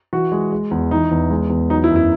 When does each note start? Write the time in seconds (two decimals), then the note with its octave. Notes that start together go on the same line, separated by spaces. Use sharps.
0.13 E3 F#4
0.32 G#3
0.52 G#3
0.71 E2
0.91 E3 D#4
1.11 E2
1.30 G#3
1.50 E2
1.70 F#3 D#4
1.84 E4
1.90 F#2
1.96 E4